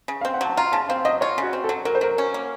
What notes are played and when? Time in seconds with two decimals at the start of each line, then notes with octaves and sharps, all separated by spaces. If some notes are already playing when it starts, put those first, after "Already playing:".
0.08 C#3
0.21 C4 F5
0.34 F#5
0.41 F#3 A5
0.57 F4 A#5
0.72 C#3 A5
0.89 C4 F5
1.05 F#3 D#5
1.21 F4 C#5
1.38 C#3 F#4
1.53 C4
1.64 A4
1.69 F#3
1.85 F#3 A#4
1.95 C5
2.01 F#3 A#4
2.18 C#4
2.34 A#3